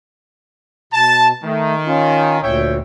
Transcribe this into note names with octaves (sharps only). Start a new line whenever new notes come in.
B2 A5
D#3 A3
C#4 F4
D2 A#2 C#5 E5 G5